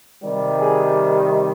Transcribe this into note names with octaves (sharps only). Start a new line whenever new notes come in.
C3 D#3 G3
G#4